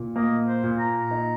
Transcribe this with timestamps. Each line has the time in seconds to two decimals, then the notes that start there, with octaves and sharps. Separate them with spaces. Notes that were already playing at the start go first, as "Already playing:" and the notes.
Already playing: A#2
0.16 A#3 D#5
0.47 C5
0.63 A#2
0.79 A#5
1.11 D#4